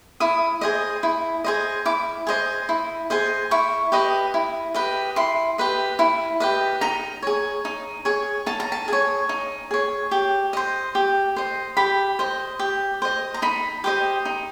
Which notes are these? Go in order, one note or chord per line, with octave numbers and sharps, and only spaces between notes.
E4 D#6
G#4 C5 D#5
E4
G#4 C5 D#5
E4 D6
G#4 C5 D#5
E4
G#4 C5 D#5
E4 C#6
G4 B4 D#5
E4
G4 B4 D#5
E4 C6
G4 B4 D#5
E4
G4 B4 D#5
D#4 A#5
G#4 C#5
D#4
G#4 C#5
D#4 A5
A#5
A5
G#4 C#5
D#4
G#4 C#5
G4
C5 D#5
G4
C5 D#5
G4 B5
C5 D#5
G4
C5 D#5
A#5
D#4 B5
G4 C5 D#5
D#4